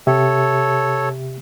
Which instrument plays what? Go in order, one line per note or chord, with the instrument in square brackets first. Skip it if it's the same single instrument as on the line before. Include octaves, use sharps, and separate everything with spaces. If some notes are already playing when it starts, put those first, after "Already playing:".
[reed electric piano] C3 G4 E5 [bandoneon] A4 C#5